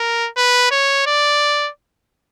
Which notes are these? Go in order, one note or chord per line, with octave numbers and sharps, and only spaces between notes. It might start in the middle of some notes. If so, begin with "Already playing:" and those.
Already playing: A#4
B4
C#5
D5